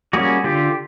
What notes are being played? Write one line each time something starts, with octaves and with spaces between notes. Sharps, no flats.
G3 A#3 C#4 F#4 G#4
D3 F4 G4